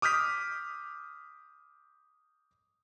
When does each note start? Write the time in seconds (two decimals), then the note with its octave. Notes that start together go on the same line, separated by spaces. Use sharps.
0.02 D6 D#6 F6 G6 B6